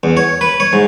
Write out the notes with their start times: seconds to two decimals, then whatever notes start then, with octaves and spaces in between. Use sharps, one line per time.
0.03 E2
0.17 C#5
0.41 B4
0.60 C#5
0.73 G#2